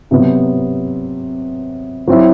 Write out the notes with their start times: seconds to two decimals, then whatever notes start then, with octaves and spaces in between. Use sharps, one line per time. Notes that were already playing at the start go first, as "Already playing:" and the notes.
0.11 C3 F#3 B3
2.07 F#3 C4 E4